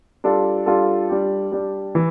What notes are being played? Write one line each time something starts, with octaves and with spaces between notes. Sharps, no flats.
G3 D4 F4 A4
G3 D4 F4 A4
G3 D4 G4
G3 D4 G4
E3